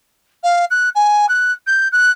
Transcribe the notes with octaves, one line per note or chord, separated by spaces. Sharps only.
F5
F#6
G#5
F#6
G6
F#6